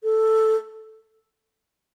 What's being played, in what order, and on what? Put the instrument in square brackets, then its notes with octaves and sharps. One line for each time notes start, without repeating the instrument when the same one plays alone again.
[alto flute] A4